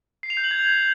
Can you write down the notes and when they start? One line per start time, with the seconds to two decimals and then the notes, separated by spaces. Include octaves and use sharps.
0.23 C7
0.30 F7
0.37 G6
0.44 F#7
0.51 G#6